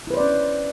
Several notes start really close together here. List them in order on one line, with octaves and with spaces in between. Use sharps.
E4 B4 C5 D5 C#4